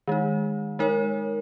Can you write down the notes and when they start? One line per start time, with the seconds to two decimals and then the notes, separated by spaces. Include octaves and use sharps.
0.08 D#3 G#3 D#4
0.79 G#3 D#4 A#4 C#5